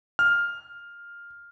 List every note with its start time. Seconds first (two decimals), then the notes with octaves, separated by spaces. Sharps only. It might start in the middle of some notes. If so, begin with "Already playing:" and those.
0.19 F6